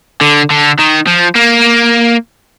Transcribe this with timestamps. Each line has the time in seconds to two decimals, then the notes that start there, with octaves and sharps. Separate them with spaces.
0.21 D3
0.50 D3
0.79 D#3
1.07 F3
1.36 A#3